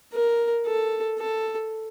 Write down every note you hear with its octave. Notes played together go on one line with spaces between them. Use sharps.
A#4
A4
A4